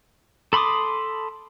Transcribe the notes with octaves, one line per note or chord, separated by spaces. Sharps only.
A4 B5 C6 D6 D#6